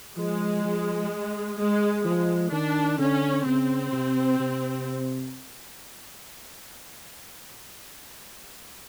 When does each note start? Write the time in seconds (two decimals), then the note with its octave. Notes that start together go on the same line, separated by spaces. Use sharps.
0.16 F3 G#3
0.64 F3
1.58 G#3
2.05 F3 G#3
2.52 D#3 D4
2.99 D3 C#4
3.45 C#3 C4
3.93 C3
4.40 C3